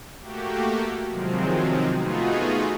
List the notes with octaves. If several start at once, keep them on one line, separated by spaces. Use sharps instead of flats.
A3 A#3 F#4 G4
C3 D#3 F3 F#3 G#3 C4
A3 B3 D#4 F4 F#4 G#4